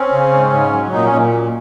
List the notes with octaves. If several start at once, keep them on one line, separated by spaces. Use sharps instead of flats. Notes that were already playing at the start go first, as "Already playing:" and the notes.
Already playing: C4 C#4
C#3
G#2
G#2
F#3
A#2 D#4
C#4
A#2